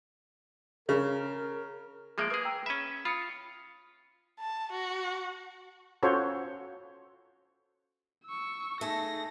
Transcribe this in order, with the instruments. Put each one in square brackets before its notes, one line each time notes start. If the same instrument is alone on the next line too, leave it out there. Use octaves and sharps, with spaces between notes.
[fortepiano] C#3 [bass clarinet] A#4
[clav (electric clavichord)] F3 G#3 A#3 [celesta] G#4 E5 D7
[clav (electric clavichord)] A#3 G#4 [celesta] B4 D#6
[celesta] G5 A#5 E6
[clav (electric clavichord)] C#4 E5 [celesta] B5 D#7
[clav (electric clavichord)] F4 [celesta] B5 D#6 C#7
[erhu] A5
F#4
[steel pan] C#4 F4 F#4 A4 C5 C#5
[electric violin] C#6 E6
[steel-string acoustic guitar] A3 G#4 [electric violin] D#4 A#6